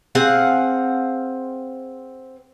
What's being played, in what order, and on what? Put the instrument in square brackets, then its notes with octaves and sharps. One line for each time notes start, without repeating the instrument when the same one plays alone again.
[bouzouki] C4 G#4 F5 F#5